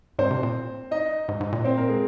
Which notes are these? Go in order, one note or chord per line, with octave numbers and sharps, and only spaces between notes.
G#2 C4 C5
C3
A#2
D#4 D#5
G#2
G#2
A#2
C4 C5
A#3 A#4
G#3 G#4